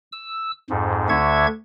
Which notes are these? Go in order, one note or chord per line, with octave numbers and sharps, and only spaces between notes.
E6
F2 G#2
D2 D3 E5 C#6 G#6